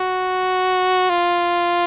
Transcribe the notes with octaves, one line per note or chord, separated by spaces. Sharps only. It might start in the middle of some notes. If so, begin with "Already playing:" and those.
Already playing: F#4
F4